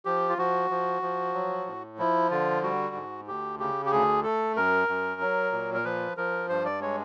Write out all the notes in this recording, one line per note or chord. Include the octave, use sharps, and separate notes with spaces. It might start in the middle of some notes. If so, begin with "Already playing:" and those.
F3 G4
F4
F3 F#4
F3
F3
F#3
A2
F3 E4
D3 F4
G3 F#4
G#2
D2 G4
C#3 G4
G4
D2 G#4
A3 A4
F#2 A#4
F#2
F#3
A#2
A#4
F3 B4
F3 A#4
G2 C5
D5
G#3 C#5